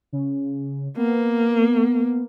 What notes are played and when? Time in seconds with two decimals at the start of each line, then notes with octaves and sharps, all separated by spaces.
0.13 C#3
0.97 A#3 B3